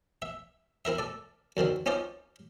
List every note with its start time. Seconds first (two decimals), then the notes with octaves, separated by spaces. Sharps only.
0.22 E5
0.85 C4 E4 A#4 E5
0.99 A4 D5
1.57 F#2 D3 D#3 C4
1.86 C4 C#4 D#4 F4 C5 D5